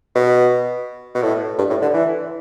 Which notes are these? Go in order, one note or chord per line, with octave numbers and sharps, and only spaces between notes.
B2
B2
A2
G2
A2
D3
E3